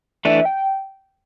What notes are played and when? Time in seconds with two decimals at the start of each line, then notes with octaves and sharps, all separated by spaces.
0.25 E3 A3 D4 E5
0.45 G5